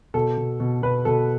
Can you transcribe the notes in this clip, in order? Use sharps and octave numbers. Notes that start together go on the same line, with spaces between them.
B2 A4
B2
B2
B2 B4
B2 A4